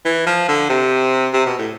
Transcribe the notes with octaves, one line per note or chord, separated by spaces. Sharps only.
E3
F3
D3
C3
C3
B2
A2